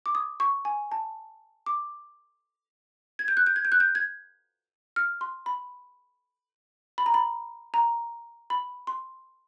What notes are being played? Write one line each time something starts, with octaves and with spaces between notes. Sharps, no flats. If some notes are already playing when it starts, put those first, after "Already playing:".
D6
D#6
C#6
G#5
A5
D6
G#6
G6
F#6
G6
G#6
G6
F#6
G6
G#6
F6
C6
B5
B5
A#5
B5
A#5
B5
C6